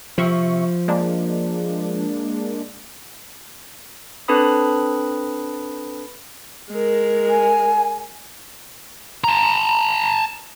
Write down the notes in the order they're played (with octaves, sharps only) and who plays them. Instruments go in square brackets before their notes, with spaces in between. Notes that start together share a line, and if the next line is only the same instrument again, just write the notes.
[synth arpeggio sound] C3 E5 C#6 [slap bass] F3
[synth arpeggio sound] G#3 A#3 D4
[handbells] C4 D4 A4 B4 B5 D#6
[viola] G#3 A#4
[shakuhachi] G#5
[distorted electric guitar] A5 A#5